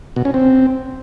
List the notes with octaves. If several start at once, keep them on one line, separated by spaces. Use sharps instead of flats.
B2
C#4
C4